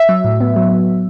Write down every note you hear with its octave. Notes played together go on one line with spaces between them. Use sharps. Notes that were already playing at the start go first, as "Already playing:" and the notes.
Already playing: E5
F#3
A2
B3
F#3